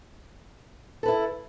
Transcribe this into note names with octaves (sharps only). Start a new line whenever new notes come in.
E4 A4 B4